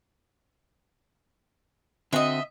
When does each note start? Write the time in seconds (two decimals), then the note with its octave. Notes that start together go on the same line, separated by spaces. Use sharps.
2.13 D3 C4 F#4 D#5 E5